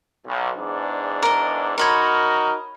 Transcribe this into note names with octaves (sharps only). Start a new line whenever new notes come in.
B1
E2 G#2 D4
A#4 D#5
D#4 F#4 A#4 C#5 B5 C6